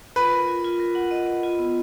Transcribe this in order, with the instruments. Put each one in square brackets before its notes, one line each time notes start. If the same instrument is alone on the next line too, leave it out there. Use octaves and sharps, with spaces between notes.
[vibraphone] F4 [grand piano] B4
[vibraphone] A#4
F4
F4
A#4
F#5
D#5
D#5
F4
B3